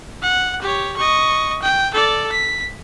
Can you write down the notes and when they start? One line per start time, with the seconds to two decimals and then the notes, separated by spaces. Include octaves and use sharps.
0.22 F#5
0.62 G4 C#5
0.97 D#5 C#6
1.62 G5
1.94 A4 D5
2.32 B6